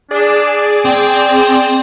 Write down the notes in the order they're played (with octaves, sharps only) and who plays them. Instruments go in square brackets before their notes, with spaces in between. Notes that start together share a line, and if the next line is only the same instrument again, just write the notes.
[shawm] D4 [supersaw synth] G#4 D5
[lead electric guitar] C4 [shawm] G5